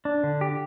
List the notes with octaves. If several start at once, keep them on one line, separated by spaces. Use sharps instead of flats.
D4
D3
G4